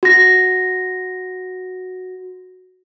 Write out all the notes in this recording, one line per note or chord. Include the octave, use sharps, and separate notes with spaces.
F#4 A#6